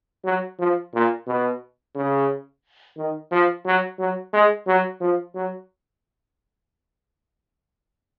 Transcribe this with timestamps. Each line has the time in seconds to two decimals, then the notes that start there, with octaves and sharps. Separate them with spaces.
0.25 F#3
0.59 F3
0.94 A#2
1.27 B2
1.95 C#3
2.97 D#3
3.31 F3
3.65 F#3
3.99 F#3
4.33 G#3
4.67 F#3
5.00 F3
5.35 F#3